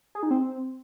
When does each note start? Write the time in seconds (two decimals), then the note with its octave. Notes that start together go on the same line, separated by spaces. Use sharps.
0.15 G#4
0.23 D#4
0.31 C4